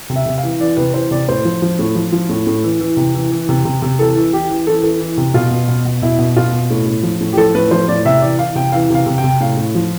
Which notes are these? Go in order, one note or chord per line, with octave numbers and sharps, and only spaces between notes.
C3
E5
C3
F5
E3
E3 D5
C3 B4
E3 C5
C3 D5
A2 C5
F3
F3
A2
F3
F3
A2
A2
E3
E3
C3
E3
E3
C3
C3
C3
E3 A4
E3
E3 G4
E3
E3 A4
E3 A4
E3
C3
B2 F4
B2
B2
B2
B2 E4
B2
B2 F4
B2
A2
A2
F3
A2
G4
F3 A4
A2 B4
F3 C5
A2 D5
C3 E5
E3 D5
E3 F5
C3 G5
E3 F5
C3 F5
C3
G5
C3
A2 F5
A2
F3